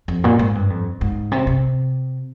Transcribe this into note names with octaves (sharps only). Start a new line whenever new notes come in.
F2
A#2
G#2
G2
F2
G#2
C3
C3